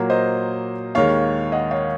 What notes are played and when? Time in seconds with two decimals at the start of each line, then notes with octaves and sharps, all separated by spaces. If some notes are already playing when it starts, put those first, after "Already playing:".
Already playing: A#2 F#3 A#3
0.10 C5 D#5
0.95 D#2 D#3 G#3 C#5 F5
1.52 D#5 F#5
1.71 C#5 F5